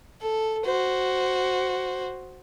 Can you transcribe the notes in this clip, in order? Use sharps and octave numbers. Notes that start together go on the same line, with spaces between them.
A4
F#4 C5